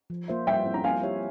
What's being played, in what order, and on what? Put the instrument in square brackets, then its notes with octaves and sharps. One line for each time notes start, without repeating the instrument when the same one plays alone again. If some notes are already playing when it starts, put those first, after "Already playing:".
[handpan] F3
A#3 F4 C5 E5
[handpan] G3 [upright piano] E5 G5
[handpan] C4 E4
[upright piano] A#5
[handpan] A#3 [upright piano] F5 G#5
[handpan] E4 G4 C#5 E5